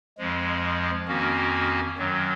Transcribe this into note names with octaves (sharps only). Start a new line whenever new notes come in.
F2 F3 G#3
F2 D#3 A#3 C#4 F#4
F#2 D#3 F#3